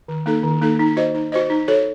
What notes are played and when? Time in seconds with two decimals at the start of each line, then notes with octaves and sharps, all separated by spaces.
0.08 D#3
0.26 A#3 D#4 A4
0.43 D#3
0.62 A#3 D#4 A4
0.79 D#4
0.97 F#4 C5 D#5
1.14 D#4
1.32 F#4 C5 D#5
1.50 D#4
1.68 F#4 A4 C#5